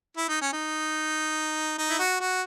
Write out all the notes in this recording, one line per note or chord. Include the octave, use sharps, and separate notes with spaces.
E4
D#4
C#4
D#4
D#4
E4
F#4
F#4